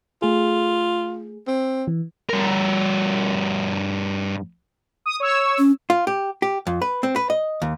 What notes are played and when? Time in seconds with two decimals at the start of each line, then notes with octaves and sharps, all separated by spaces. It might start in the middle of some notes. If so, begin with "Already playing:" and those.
0.22 A3 F4 G#4
1.47 C4
1.87 E3
2.29 G2 A#4
5.06 D#6
5.20 C#5 E6
5.58 C#4
5.90 F4
6.07 G4
6.42 G4
6.67 F2
6.82 B4
7.03 C4
7.16 B4
7.30 D#5
7.62 D#2